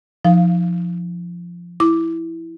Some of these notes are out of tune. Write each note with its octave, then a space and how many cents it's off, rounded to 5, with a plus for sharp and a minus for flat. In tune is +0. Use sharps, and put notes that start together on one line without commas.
F3 +0 D#4 +15 F5 +0
E4 +0 D6 +0